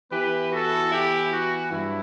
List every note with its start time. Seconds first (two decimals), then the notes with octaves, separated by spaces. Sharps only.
0.12 E3 B3 E4 G4 B4
0.52 F#4 A4
0.92 E4 G4
1.31 F#4
1.72 G2 F#3 E4